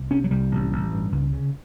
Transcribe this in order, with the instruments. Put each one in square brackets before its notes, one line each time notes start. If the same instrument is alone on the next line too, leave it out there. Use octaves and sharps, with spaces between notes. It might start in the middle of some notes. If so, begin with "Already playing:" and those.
Already playing: [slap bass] C2
C3 C#4
F#3
C2 G3
A1
A1
G2
C#2
C#3